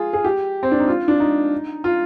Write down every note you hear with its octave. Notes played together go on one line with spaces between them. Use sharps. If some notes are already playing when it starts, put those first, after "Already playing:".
Already playing: F4 G#4
G#4
G4
C4
D4
D#4
F4
D4
D#4
F4